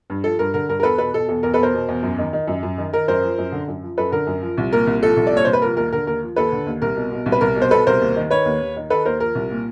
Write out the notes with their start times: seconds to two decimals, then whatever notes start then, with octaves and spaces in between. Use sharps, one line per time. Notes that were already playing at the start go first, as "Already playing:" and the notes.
0.10 G2
0.24 F3 A4
0.39 G2 A#4
0.54 D3 A#4
0.69 G2 A#4
0.80 A#4
0.83 E2 A4 B4
0.98 B2 A4 B4
1.13 B2 A4
1.29 E2 A4
1.43 E2 A#4
1.54 A4 B4
1.58 B2 A#4 C5
1.74 B2
1.89 E2
2.03 F#2
2.18 D#3
2.33 D#3
2.48 F#2
2.63 F#2
2.78 D#3
2.93 D#3 A#4
3.08 F#2 A#4 C5
3.23 F3
3.38 F#2
3.52 D3
3.68 F#2
3.83 F3
3.98 F#2 A4 B4
4.12 D3 A#4
4.27 F#2
4.42 F3
4.58 C2
4.72 A#2 A#4
4.87 C2
5.02 F3 A4
5.17 C2
5.27 D5
5.32 A#2 C#5
5.45 C2 C5
5.53 B4
5.62 F3 A#4
5.77 D#2 A#4
5.93 D3 A#4
6.07 D#2 A#4
6.22 F3
6.36 D#2 A4 B4
6.52 D3
6.67 D#2
6.82 C2 A#4
6.96 B2
7.12 B2
7.26 C2
7.32 B4
7.41 C2 A#4
7.56 B2
7.62 C5
7.71 B2 A4 B4
7.87 C2 A#4 C5
8.01 D#2
8.16 D#3
8.30 D#3 B4 C#5
8.45 D#2
8.61 D#2
8.77 D#3
8.90 D#3 A4 B4
9.05 D#2 A#4 C5
9.20 F3 A#4
9.35 C2
9.51 A#2